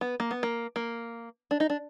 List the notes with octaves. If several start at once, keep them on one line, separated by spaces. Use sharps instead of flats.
B3
A#3
B3
A#3
A#3
D4
D#4
D4